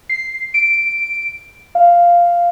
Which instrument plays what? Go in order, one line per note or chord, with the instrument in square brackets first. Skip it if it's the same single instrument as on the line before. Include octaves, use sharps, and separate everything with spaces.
[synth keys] C7
D7
F5